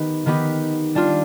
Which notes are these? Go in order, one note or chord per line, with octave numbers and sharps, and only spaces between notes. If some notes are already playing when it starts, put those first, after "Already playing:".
Already playing: D#3 B3 D#4 G4 B4
D#3 B3 D#4 G4 B4
G3 D4 F4